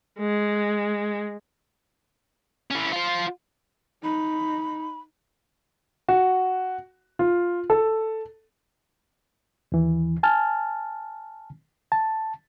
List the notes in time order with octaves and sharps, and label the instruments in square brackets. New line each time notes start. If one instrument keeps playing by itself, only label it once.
[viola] G#3
[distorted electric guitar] E3 C#4
F4 C5
[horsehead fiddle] D#4 [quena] B5
[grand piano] F#4
F4
A4
[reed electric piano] D#2 E3
G#5 A5 F6
A5